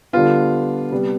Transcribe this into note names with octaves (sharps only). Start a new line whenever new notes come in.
D3 G3 B3 F4
C3 G3 B3